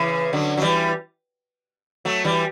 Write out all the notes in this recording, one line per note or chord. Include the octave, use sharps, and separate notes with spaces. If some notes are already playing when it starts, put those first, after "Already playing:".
Already playing: C#3 E3
D3 F#3
F#3
E3 G3
F#3 A3
E3 G3